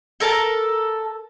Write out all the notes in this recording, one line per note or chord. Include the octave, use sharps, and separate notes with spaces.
A4 A#4 A5